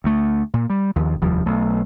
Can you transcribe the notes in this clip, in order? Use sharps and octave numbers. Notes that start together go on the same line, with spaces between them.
D2 A3
A#2
G3
D#2 D#3 F3
F1 D#2 F3 G3
B1 A3